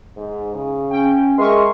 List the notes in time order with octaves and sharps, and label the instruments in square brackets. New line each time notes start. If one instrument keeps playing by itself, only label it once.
[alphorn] G#2
C#3
[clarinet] C#4 [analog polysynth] G5
[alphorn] G#3 [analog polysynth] A#4 E5 C#6 [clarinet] C6